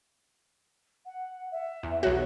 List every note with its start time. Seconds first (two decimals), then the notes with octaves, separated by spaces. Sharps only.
1.06 F#5
1.51 E5
1.83 E2
2.03 B1 F#4 C#5